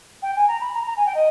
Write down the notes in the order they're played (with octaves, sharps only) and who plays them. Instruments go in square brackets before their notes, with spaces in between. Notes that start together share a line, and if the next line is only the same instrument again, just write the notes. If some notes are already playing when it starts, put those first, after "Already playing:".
[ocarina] G5
G#5
A#5
B5
A#5
A#5
G#5
G5
D#5